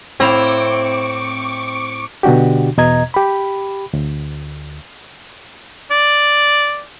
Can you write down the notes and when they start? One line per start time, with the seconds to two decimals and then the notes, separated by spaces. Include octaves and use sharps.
0.20 A2 C4 E4 F5 C#6 D6 D7
2.23 B2 D3 D4 F#4 G4
2.78 E2 B2 D#5 A#5 G#6
3.14 G4 B5
3.93 D2
5.91 D5